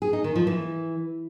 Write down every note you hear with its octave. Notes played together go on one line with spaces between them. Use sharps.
G#4
D#4
D#3
F3
E3